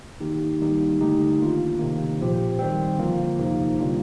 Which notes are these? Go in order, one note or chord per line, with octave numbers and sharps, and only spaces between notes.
D#3 A#3 D#4 G4
D#3 G3 A#3 D#4 G4
D3 A3 D#4 G4
D#3 A#3 D4 F4
C3 D#3 A#3
A#2 F3 C4 G4
D#3 G3 C4
D3 F3 A#3 F4
F2 C3 F3 A#3 D#4
D3 G3 A#3 D4 F4